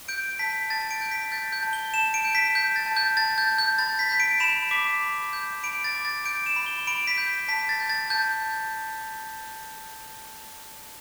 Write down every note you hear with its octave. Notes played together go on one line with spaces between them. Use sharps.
G6 D7
A5 B6
A5 A6
D7
G6
B6
G6 A6
G6
A5
G7
A5 E7
D7
G6
B6
G6
A6
A5
G6
A5 A6
G6
G6
G6
B5 A6
B6
G6 B6
D7
B5 E7
D6 B6
B5
G6
B5 D7
A6
D6
A6
G6 D7
E7
B5
G7
B5 D7
B6
G6
A5 B6
A6
G6
A6
A5 G6